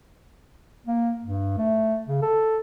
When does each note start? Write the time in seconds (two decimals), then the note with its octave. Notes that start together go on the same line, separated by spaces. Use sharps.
0.87 A#3
1.25 G2
1.58 A3
2.07 C#3
2.22 A4